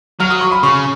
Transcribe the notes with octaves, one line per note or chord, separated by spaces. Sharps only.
F#3 F6
D#6
C#6
B5
C#3 C#6